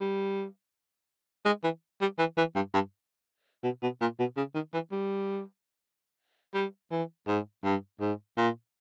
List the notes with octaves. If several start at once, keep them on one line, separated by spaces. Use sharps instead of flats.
G3
G#3
E3
G3
E3
E3
G2
G2
B2
B2
A#2
B2
C#3
D#3
E3
G3
G3
E3
G#2
G2
G#2
A#2